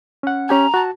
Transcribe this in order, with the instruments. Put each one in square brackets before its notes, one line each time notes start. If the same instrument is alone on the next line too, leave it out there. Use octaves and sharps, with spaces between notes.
[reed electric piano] C#4 F#5
[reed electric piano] C#4 G4 G#5 [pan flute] A#5
[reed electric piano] F#4 A5